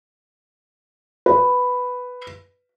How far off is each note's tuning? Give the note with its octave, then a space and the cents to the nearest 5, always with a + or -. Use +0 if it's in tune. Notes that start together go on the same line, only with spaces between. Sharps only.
B4 +5